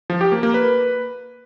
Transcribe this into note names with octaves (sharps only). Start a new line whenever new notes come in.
F3
G4
A#3
A#3
B4